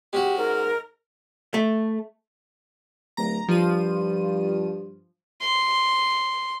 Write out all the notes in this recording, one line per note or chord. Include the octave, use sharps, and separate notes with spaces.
G#3 C#4 F#4 G4
G#2 A#4
A3
D1 A#5
G2 F3 D#7
C6